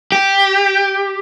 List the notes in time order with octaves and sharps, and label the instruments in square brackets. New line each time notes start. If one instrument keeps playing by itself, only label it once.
[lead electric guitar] G4